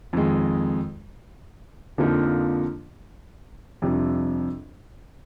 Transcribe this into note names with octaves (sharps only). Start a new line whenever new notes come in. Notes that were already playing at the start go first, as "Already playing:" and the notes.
F2 D#3 G#3
F2 D3 F3 A#3 D#4
F2 C3 G3 D4